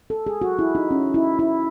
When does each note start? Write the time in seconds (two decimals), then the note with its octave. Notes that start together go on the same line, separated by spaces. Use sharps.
0.10 A4
0.27 G#4
0.42 F#4
0.59 E4
0.75 D#4
0.91 C#4
1.14 E4
1.39 E4